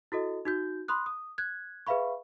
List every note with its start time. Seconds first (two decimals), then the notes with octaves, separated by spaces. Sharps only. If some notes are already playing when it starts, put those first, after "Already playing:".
0.12 E4 F#4 A4 D#5
0.45 D#4 F#4 G6
0.88 B5 C6 D#6 F#6
1.06 D#6
1.38 F#6 G#6
1.87 G#4 B4 E5 F5 B5 C#6